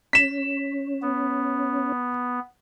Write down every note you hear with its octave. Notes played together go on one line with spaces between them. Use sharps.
C#4 B6 E7
B3